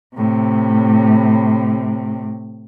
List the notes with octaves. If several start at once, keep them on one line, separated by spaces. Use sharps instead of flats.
A2 C3